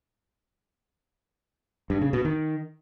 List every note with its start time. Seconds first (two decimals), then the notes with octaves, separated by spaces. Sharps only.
1.90 G2
2.02 C#3
2.13 B2
2.25 D#3